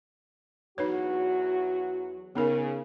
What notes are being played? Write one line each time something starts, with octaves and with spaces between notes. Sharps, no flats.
E2 F#3 D#4 F#4 B4 C#5
C#3 B3 D#4 A#4